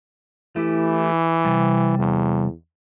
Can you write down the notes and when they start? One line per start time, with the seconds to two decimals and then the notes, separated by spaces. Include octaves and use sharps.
0.56 E3 A3 E4 G4
1.45 C3 G3
1.98 E2